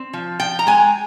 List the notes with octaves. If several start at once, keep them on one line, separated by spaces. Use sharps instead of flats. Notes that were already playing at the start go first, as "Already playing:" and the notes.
Already playing: C4
F3
F3 G5
A#5
G#3 G#5